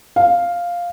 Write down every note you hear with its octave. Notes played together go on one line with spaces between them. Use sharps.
F5